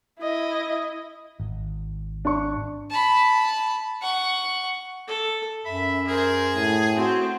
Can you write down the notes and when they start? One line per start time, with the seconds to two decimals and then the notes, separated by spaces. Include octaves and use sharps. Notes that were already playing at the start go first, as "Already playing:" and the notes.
0.20 E4 D#5
1.40 G#1
2.25 D4 C#6
2.90 A5 B5
4.02 F#5 C#6
5.08 A4
5.65 F#2 E5 B5
6.07 G#4 A#4 C5
6.56 A2 G#5
6.96 C4 F#4 C5